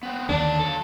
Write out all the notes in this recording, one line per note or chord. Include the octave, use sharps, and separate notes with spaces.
B3 C4
D#2 D3 F#3 D4 A5
A4